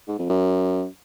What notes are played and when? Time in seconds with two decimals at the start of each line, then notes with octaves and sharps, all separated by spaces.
0.08 G#2
0.19 F2
0.30 F#2